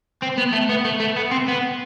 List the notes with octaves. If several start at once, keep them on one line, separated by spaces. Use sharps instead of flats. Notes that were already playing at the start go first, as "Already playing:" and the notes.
C4
B3
A3
B3
A3
A3
B3
C4
B3